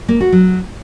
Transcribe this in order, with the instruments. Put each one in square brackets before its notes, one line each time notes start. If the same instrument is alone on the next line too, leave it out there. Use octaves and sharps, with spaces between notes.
[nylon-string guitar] A#3
F#4
F#3